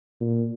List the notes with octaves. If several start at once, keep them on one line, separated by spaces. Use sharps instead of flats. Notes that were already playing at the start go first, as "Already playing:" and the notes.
A#2